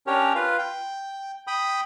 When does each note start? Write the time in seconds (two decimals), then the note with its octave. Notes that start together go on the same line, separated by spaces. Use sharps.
0.07 C#4 D4 G4 A#4 C#5
0.35 F4 B4 F5
0.59 G5
1.47 G5 B5 D#6